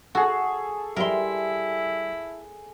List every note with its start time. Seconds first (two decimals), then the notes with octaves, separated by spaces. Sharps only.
0.15 F#4 G#4 A4
0.96 G3 E4 G4 A#4 E5 C6